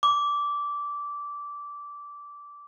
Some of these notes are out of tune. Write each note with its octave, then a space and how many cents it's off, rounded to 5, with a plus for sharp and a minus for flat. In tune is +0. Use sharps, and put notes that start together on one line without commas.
D6 -15